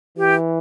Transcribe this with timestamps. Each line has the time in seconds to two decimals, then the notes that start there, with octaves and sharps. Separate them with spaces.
0.17 E3 G4